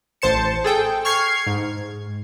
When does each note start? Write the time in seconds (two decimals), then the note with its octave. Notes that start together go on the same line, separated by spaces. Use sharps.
0.22 A1 C5 A5 C#7
0.64 G#4 A4 G5
1.05 C#6 F6 G#6 C7
1.47 G#2